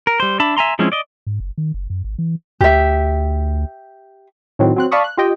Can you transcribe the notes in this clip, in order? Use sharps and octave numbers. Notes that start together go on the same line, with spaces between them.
A#4
G3 C5
D4 E5 A5 B5
E5 G#5 A#5 C6
F3 G#3 C4 C#4 E4
D5 D#5
G#2
F#1
D#3
F#1
F#2
G#1
E3
D2 G4 E5
A2 D#3 F#3 C4
F#3 C4 F#6
D5 F5 A5 B5 C#6 D#6
F#6
F4 G4 D#5 G5